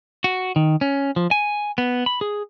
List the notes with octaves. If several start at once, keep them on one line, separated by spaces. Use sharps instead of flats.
F#4
D#3
C#4
F3
G#5
B3
B5
G#4